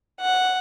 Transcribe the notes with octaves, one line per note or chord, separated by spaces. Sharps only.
F#5